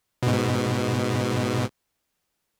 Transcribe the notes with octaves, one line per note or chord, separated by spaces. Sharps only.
G#2 B2